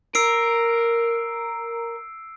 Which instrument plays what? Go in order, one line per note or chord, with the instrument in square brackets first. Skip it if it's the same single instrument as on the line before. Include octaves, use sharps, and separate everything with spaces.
[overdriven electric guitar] A#4 [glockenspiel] E6 C7 D7